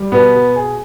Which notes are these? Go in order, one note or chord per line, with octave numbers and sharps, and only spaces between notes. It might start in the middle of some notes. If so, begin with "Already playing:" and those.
Already playing: G3
B2 B3
B2
G#4